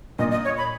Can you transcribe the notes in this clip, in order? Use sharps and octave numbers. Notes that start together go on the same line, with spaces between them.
A#2 D#5
D#5
C#5
B5